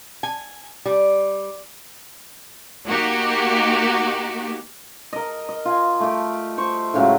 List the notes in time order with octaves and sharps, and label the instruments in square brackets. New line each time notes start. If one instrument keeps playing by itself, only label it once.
[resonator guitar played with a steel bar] G#5
G3
[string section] A#3 D#4 F#4 G4
[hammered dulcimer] A#4 D#5
D#5
F4 G#5
A3 G4
C5 C#6
A2 C#3 F#3 G#3